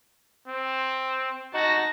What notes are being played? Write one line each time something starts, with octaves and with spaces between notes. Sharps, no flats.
C4
D#4 F#4 A5 A#6